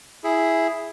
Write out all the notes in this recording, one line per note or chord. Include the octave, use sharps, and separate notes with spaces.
E4 G#4